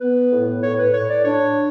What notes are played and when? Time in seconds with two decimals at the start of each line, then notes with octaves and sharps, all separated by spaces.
0.01 B3 B4
0.31 A2
0.62 A2 C#5
0.78 B4
0.93 A2 C#5
1.09 D5
1.24 D4 C#5